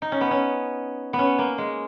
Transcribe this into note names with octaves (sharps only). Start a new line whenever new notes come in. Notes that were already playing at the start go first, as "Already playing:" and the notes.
D#4
C#4
B3
C#4
B3
C#4
A#3
G#3